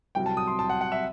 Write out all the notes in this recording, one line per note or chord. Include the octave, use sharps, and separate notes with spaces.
C2 C3 F#3 G5
A5
D#6
C6
A5
F#5
F#5
E5